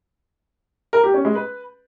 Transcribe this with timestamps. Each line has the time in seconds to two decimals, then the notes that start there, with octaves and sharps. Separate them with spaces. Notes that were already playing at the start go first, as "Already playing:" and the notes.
0.93 A#4
1.03 G4
1.14 C#4
1.25 G#3
1.35 B4